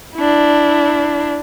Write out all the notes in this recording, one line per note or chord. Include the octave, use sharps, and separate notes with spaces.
D4 E4